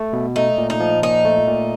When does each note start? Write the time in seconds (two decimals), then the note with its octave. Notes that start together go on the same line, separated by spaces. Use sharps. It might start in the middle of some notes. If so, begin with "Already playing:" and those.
Already playing: A3
0.13 B2
0.36 A3 D#4
0.58 A#2
0.70 D#4
0.80 F3
1.03 A#2 D#4
1.25 A3
1.47 A#2